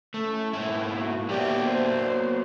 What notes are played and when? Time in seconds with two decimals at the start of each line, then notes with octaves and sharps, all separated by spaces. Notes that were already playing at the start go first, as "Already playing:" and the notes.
0.14 A3 C#4 E4
0.53 G#2 A#3 B3 E4
0.99 F#4
1.29 F#3 G4 D5 E5
1.67 C5